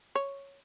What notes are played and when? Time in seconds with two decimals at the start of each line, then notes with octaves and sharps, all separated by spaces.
0.15 C#5